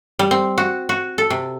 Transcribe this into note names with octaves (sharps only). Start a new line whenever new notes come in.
G3
C4
F#4
F#4
A4
C3